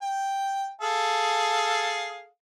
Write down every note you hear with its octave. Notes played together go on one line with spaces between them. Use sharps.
G5
G#4 A4 F5